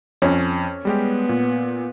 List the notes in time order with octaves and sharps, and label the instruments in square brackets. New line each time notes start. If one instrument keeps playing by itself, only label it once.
[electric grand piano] F2 [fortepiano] C#4
[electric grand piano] G3 G#3 G4 [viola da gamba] B3
[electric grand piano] A#2